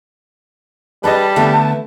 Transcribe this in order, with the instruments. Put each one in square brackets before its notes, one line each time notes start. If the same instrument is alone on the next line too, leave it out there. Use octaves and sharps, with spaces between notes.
[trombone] G3 [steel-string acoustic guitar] D4 G#4 [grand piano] B4 D#5 [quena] A5
[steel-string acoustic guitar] D3 B3 E4 [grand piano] A3 E5